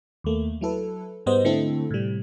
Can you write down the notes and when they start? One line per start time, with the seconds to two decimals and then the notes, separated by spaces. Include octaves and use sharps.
0.24 D#2 A3 A#3
0.61 F#3 E4 A4 B4
1.26 G#2 G3 G#3 B3 C5 D#5
1.45 D3 A3 C4 E4 A4
1.91 A2 C3 G3